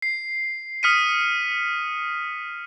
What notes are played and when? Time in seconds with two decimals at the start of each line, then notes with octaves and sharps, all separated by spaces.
0.02 C7
0.83 D#6 F6 B6 C#7 D#7